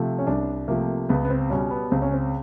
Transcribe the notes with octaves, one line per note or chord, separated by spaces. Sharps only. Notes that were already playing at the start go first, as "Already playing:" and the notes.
Already playing: C3 F3 A3
C#4
C2 D4
C3 F3 A3 A#3
C#2 B3
B3
C4
B2 G3 C#4
B3
C#2 C4
C#4
C4